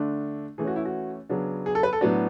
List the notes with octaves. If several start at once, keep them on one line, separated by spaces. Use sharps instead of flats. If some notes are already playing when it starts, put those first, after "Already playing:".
Already playing: D3 A3 D4
E3 A3 C#4 G#4
F#4
E4
F#4
C#3 F#3 B3 D4
G#4
A4
B4
A4
A2 F#3 B3 D4 F#4